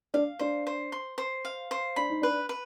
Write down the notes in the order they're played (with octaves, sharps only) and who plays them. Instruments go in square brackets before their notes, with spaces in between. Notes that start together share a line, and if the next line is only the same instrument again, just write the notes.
[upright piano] D4 [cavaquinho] F5
[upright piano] D4 [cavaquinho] C5
[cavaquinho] C5
C6
C5
F5
C5
[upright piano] D4 [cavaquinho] B5
[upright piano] D#4
[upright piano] D4 [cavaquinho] B4
[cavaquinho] B4